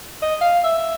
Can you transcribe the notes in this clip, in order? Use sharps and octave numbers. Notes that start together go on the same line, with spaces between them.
D#5
F5
E5